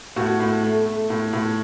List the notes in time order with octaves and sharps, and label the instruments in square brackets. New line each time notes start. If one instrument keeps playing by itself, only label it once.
[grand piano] A2 F#4
A2
A3
A3
A2
A2